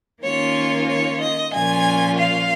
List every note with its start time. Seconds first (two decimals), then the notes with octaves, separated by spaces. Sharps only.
0.23 D#3 A#3 C#4 F4 C#5
0.87 C#5
1.20 D#5
1.52 A#2 F3 C#4 F4 G#5
2.18 F5